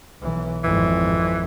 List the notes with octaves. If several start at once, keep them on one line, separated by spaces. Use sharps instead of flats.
B1 E3
G#1 F2 E3